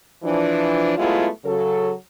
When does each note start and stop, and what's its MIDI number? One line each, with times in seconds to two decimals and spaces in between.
0.24 0.93 52
0.24 0.93 53
0.24 0.93 62
0.97 1.28 54
0.97 1.28 56
0.97 1.28 57
0.97 1.28 59
0.97 1.28 64
0.97 1.28 65
1.44 1.92 49
1.44 1.92 54
1.44 1.92 69